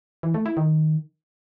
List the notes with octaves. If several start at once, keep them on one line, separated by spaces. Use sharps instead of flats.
E3
A3
E4
D#3